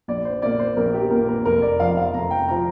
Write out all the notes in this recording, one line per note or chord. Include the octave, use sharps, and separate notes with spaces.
A#1 D5
C5
A#2 A#3 D5
C5
A#1 A#4
G4
A#2 A#4
A#3
A#4
F1 A#4
D5
F2 F3 F5
F5
F1 A#5
G5
F3 A#5